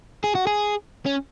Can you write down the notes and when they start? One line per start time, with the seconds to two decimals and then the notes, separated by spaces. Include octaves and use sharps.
0.24 G#4
0.35 F#4
0.47 G#4
1.06 C#4